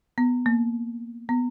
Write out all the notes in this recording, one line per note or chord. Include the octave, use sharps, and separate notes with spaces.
B3
A#3
B3